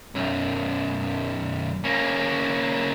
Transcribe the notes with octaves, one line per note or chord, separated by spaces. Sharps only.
B1 F#2
A#3 C#4